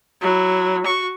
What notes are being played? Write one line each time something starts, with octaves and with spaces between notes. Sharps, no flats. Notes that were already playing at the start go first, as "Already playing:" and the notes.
F#3 E4
F#4 C#6